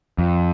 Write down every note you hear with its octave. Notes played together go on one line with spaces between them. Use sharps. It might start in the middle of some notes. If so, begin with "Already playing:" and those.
F2